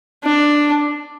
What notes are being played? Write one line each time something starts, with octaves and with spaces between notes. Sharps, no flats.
D4